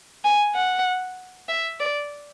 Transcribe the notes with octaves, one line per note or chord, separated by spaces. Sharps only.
G#5
F#5
E5
D5